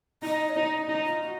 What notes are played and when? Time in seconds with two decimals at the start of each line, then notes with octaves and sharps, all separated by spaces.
0.22 D#4 D#5
0.49 C#5
0.55 D#4 D#5
0.89 D#4
1.06 F4
1.22 F#4